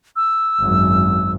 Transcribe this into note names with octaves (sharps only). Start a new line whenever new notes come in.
E6
G#1 F#2